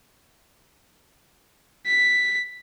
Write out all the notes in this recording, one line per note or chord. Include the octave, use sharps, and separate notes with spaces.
B6